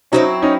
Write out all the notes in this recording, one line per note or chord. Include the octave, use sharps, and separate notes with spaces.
F#3 A3 C4 C#4 D#4 E4
C#4 D#4